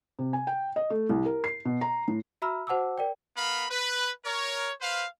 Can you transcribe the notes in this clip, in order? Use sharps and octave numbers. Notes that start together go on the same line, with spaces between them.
C3
G#5
G5
D#5
A3
C2
A#4
C7
B2
A#5
A2
F#4 E5 A#5 B5 E6 F6
F#4 C5 F#5 A5 D6 E6
A#4 D5 G5
B3 A#4 F5 B5
B4
A#4 C#5
B4 C5 F5